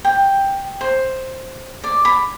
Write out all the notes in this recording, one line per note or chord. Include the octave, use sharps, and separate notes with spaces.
G5
C5
D5
B5